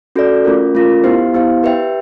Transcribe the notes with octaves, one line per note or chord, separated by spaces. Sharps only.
C#4 F#4 A4 D5
A3 C#4 F4 A#4
A3 C#4 F4 A#4
B3 E4 G4 C5 F5
B3 E4 G4 C5 F5
G4 B4 E5 G5